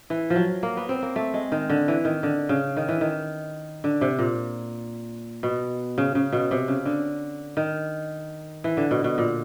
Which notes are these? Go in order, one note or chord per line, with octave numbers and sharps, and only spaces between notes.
E3
F3
F#3
A#3
B3
C4
A#3
A3
G#3
D#3
D3
E3
D#3
D3
C#3
D#3
E3
D#3
D3
C3
A#2
B2
C#3
C#3
B2
C3
C#3
D3
D#3
E3
D3
B2
B2
A#2